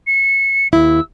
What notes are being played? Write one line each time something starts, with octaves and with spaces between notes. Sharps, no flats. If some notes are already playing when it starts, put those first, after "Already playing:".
C#7
D#2 E4 E6